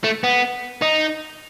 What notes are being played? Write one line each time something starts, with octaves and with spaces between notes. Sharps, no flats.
A3
B3
D#4